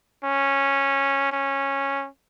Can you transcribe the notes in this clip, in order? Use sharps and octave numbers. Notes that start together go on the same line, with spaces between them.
C#4
C#4